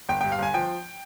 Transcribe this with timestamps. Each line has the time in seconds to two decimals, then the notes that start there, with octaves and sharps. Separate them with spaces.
0.09 G1 G5
0.21 G2 G5
0.32 F5
0.39 G1 G#5
0.54 F3 G5